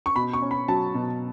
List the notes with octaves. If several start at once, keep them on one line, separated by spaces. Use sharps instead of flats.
C#6
B2 B5
C#6
C#4
B5
F#3 A5
B2